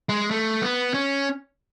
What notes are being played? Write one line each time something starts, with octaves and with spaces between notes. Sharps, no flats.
G#3
A3
B3
C#4